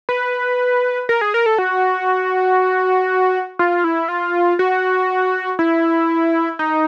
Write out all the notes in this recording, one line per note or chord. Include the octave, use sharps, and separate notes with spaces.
B4
A#4
G#4
A#4
A4
F#4
F4
E4
F4
F#4
E4
D#4